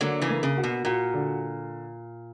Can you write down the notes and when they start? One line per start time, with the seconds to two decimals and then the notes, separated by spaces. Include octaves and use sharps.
0.01 D3 F#3 A#3
0.22 C#3 E3
0.29 A#3
0.43 C#3
0.58 F#4
0.63 B2
0.85 A#2 F#4
1.14 D3